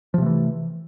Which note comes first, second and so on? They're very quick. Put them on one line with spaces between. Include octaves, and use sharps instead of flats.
F3 C3 A3 E3